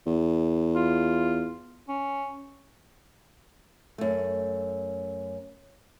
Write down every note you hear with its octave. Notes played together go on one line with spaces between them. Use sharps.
E2
F4
C#4
F#2 A3